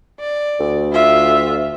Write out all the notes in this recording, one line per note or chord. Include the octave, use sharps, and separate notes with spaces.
D5
D2
F4 E5